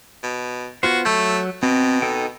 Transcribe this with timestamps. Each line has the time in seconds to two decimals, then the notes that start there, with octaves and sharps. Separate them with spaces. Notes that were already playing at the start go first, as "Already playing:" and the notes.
0.23 B2
0.83 B3 F4 F#4 C5
1.05 F#3 A3 E6 G6
1.63 B2 C4
2.02 D#4 A4 G5